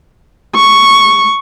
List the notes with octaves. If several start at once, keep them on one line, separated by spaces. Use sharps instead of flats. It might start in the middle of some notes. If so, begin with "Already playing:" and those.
C#6